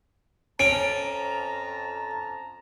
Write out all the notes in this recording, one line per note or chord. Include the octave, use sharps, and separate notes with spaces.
F2 C#4 A5 A#5 D7